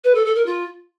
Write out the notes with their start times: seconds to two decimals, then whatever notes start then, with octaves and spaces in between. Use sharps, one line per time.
0.04 B4
0.15 A4
0.25 A4
0.35 A#4
0.46 F4